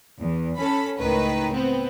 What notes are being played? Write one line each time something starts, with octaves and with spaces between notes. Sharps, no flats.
E2
C#4 A4 B5
C#2 A2 D#3 B4
B3 C4